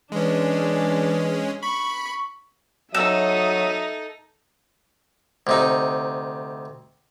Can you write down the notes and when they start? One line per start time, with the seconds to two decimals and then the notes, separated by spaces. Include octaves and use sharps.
0.12 E3 G#3 C#4 D4
1.63 B5 C#6
2.95 F#3 D#4 A4 E5 D#6 E6
5.47 D2 C3 D#4